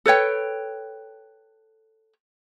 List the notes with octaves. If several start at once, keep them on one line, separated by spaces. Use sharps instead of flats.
A4 B4 C#5 G5